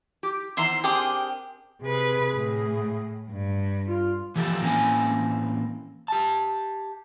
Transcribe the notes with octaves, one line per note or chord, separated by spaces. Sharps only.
G4
E2 D#3 C5 E5 A#5 C6
C4 D4 G4 G#4 A#4 D#6
C3 G#4 B4
A2
G2
F4
E3 F3 G4 A4
A2 E3 A#3 C4 C#4 G#5
G4 A5